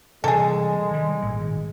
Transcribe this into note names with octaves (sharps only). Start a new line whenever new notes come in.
C3 E3 G3 G#3 G#4 A4
D#3 G3
G#1 A#2